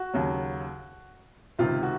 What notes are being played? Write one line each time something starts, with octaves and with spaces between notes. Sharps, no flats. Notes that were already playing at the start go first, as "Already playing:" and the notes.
Already playing: F#4
D#2 C#3 F#3
C#2 C3 D#3 F4
F#4